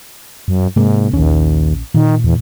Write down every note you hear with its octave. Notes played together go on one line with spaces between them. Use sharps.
F#2
G#2 C3 G#3 A#3
A#1 D#2 C#4
A#2 D#3
E2